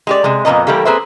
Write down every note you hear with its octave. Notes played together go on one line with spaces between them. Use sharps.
G#3 G4 D5
C3 G#3
F2 A#2 E3 A#3 B3 D#5
E3 G3 A3 A#3 G4
A#3 C4 G#4 B4 C5 E5